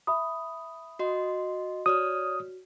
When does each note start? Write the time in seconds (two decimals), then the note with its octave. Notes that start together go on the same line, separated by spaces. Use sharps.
0.07 E5 B5 D#6
0.99 F#4 D#5 C6
1.86 F#4 C#5 D5 D#6 F6